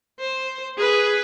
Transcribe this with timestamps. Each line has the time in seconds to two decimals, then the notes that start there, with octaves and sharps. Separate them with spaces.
0.20 C5
0.78 G#4 B4